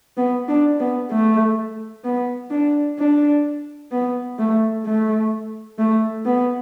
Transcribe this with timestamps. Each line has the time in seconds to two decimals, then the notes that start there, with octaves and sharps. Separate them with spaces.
0.17 B3
0.48 D4
0.80 B3
1.11 A3
2.04 B3
2.51 D4
2.98 D4
3.92 B3
4.39 A3
4.85 A3
5.78 A3
6.25 B3